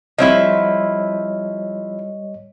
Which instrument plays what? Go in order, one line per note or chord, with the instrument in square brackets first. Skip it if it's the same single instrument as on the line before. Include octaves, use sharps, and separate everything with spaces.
[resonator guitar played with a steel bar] F3 C4 E4 [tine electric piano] G3 C#5 D#5